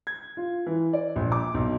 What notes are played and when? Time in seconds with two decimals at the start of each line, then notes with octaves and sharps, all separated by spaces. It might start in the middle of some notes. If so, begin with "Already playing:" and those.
0.07 G#6
0.37 F4
0.66 E3
0.93 D5
1.16 A#1
1.32 D6
1.54 B1